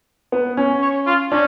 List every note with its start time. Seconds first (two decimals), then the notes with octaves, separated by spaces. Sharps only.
0.32 B3
0.57 C#4
0.82 C#5
1.07 F4
1.31 C#4 D4